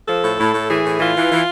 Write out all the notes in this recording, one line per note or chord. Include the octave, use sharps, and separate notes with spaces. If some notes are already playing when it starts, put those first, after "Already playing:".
F3 A4
A2
A2
A2
E3 G#4
A2
E3 F4
E3
E3